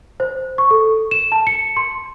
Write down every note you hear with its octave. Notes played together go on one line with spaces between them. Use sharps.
C5
C#6
A4
E7
A5
C#7
C6